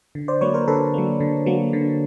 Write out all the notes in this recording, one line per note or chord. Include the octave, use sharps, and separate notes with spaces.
D3
C5 D5
F#3 A#3 B4 C#5
A#4 C5
D3 A4 B4
F#3 A#3
D3
F#3 A#3
D3